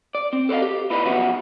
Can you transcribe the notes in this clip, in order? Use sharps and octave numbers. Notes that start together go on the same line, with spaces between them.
D5
C4
A4 C5 C#5 D#5 F5
G4
E4 F4 G4 B4 D5 D#5
B1 B2 F3 C#4 F#4 E5